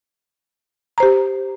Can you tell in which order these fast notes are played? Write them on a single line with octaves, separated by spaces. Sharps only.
A#5 C5 G4